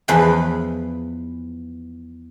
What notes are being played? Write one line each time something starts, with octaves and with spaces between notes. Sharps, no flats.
E2 F3 B4 G5